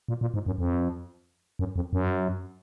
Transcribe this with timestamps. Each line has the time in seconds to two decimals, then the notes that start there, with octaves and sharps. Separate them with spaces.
0.08 A#2
0.21 A#2
0.34 G#2
0.46 F#2
0.58 F2
1.59 F#2
1.76 F2
1.93 F#2